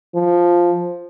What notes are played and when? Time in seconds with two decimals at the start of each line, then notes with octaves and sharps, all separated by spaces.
0.15 F3